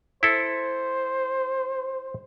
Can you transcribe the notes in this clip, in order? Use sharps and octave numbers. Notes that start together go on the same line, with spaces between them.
E4 A4 C5